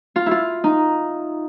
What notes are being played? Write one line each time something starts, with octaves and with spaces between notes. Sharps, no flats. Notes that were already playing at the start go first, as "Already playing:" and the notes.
F4
E4 F4
D#4